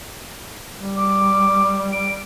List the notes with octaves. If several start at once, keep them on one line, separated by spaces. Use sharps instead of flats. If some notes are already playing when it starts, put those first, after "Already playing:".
G3
D6
D7